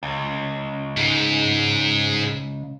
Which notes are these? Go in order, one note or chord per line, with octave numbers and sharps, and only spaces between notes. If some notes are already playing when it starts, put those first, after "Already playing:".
C#2
G#2